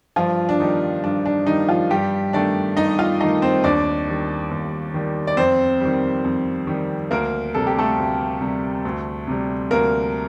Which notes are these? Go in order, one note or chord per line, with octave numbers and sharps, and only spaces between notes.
G2 F3 F4
D4
D#3 G3 D#4
G2 D4
D4
D#3 G3 D#4
F3 F4
G2 G3 G4
D#3 A3 D4 D5
G2 D#4 D#5
F4 F5
D#3 A3 D#4 D#5
C4 C5
D#2 D4 D5
D#3 G3
D#2
D#3 G3
D5
F2 C4 C5
D#3 G3
F2
D#3 G3
D2 A#3 A#4
C3 G3 A4
G4
A3 A4
D2
C3 G3
D2
C3 G3
D2 A#3 A#4